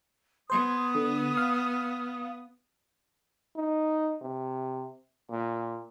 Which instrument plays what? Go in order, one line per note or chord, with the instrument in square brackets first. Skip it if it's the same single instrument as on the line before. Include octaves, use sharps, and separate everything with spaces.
[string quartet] B3 [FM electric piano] C5 C6 G#6 [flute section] D#6
[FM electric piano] D3
F5
[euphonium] D#4
C3
A#2